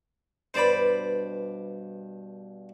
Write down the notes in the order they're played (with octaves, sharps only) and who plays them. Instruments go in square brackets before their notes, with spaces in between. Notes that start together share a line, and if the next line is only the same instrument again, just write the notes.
[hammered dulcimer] G2 B2 D6 [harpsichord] C5 D5 B5